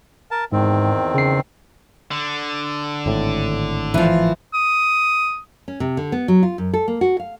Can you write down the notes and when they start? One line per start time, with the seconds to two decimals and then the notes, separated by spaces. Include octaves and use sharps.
0.31 A#4 A5
0.52 E2 G#2 D#3 C4
1.14 C#3 C7
2.11 D3
3.06 G#1 A2
3.94 E3 F3
4.54 D#6
5.68 C#4
5.80 C3
5.97 D3
6.12 B3
6.28 F#3
6.43 F4
6.58 F#2
6.74 A4
6.88 A#3
7.01 F#4
7.20 F5